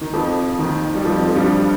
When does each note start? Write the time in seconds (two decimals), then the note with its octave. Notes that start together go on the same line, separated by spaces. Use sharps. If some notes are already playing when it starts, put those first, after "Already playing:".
0.01 D#3
0.14 F2 F3
0.59 D#2 D#3
0.95 G3
1.05 F2 F3
1.25 F3
1.35 G2 G3